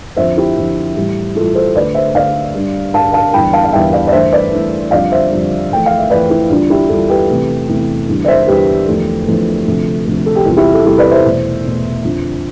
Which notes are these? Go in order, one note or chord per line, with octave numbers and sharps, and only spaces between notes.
F2 D3 F3 C5 E5
E4 G4
F2 D3 F3
A2 E3 G3
A2 E3 G3 F4 A4
A4 C5
D2 D3 A3 B4 D5
C5 E5
D2 D3 A3 D5 F5
G2 D3 G3
G2 D3 G3 F5 A5
F5 A5
E2 D3 G3 G5 B5
F5 A5
F5
E2 D3 G3 E5 G5
D5 F5
D5
G2 E3 A3 C5 E5
B4 D5
G2 E3 A3
F2 D3 G3 D5 F5
C5 E5
F2 D3 G3
F2 E3 A3 G5
F5
E5
F2 E3 A3 B4 D5
E4
E2 D3 G3 D4 F4
E4 G4
E2 D3 G3 F4 A4
G4 B4
E2 C3 E3 A3
E2 C3 E3 A3
E2 D3 G3
D5
C5 E5
E2 D3 G3 G4 B4
E2 D3 F3 A3
E2 D3 F3 A3
D2 C3 F3 A3
D2 C3 F3 A3
A4
G4
E2 C3 G3 F4
E4 G4
A4
E2 C3 G3 E4 G4
B4 D5
C5 E5
E2 B2 A3
E2 B2 A3
F2 D3 F3